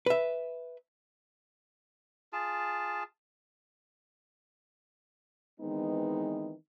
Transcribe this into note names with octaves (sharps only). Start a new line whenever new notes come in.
B4 E5
F4 G#4 A5
D#3 E3 G#3 B3 C4 D#4